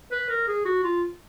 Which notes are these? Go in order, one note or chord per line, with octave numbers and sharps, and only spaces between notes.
B4
A#4
G#4
F#4
F4